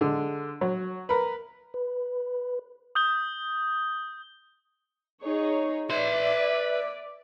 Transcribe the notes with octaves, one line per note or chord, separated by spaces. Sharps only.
D3 G#3
F#3
A#4 B4
B4
D#6 G6 G7
D#4 G#4 C#5
B4 D5 E5 C6